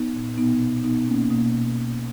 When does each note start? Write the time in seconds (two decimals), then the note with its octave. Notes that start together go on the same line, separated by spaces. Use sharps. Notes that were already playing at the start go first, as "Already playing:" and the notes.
Already playing: B3 D#4
0.14 A#2
0.38 B2 B3 D#4
0.61 B2
0.83 B2 B3 D#4
1.08 B2 A#3 C#4
1.30 B2 A#3
1.54 B2
1.77 B2